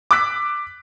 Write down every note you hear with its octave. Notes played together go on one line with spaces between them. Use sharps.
D6 E6 F#6 B6